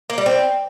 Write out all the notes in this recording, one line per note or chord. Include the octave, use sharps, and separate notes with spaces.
A#3
G3
C4